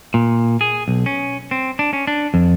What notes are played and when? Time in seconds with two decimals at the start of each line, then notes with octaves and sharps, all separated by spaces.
0.14 A#2
0.61 G#4
0.88 B1
1.06 C#4
1.51 C4
1.79 D4
1.93 C#4
2.07 D4
2.34 F2